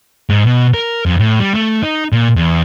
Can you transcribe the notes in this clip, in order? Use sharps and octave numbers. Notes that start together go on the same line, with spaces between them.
G#2
B2
A#4
F2
A2
G3
A3
D#4
A#2
E2